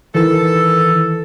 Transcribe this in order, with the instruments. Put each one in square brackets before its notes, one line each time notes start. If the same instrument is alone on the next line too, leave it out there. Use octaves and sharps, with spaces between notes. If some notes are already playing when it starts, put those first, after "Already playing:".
[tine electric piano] D#3 E3 [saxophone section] A4